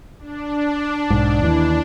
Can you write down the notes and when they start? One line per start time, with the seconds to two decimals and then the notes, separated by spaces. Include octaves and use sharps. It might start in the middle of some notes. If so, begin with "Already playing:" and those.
0.19 D4
1.10 B1 G#2
1.42 D#2 E3